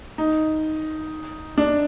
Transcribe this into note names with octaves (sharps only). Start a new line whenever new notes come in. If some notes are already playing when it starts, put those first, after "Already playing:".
D#4
D4